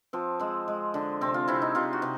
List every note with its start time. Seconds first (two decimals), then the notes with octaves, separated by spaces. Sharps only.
0.13 F3 C4
0.40 G#3 C4
0.68 G#3
0.94 D3
1.21 C3 C4
1.34 F4
1.48 C3 E4
1.62 D#4
1.75 C3 F4
1.93 F#4
2.02 C3